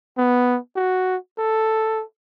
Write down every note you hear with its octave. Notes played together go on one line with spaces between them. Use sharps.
B3
F#4
A4